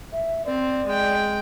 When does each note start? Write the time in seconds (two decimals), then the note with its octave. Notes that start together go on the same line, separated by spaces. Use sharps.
0.13 E5
0.46 C4 D5
0.86 G#3 G5